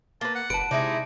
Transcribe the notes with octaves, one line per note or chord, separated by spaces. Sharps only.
A#3 B4 A5
F#5
F#1 B4 A5 D7
C3 G#3 D#4 E4 D5